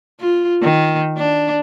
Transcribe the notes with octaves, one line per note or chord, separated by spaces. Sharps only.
F4
D#3
D4